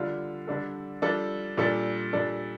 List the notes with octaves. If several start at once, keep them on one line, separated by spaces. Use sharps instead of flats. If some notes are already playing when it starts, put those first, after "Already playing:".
Already playing: D3 G3 D4 F4
D3 G3 D4 A4
G3 D4 F4 A4
A#2 G3 D4 A4
A#2 G3 D4 A4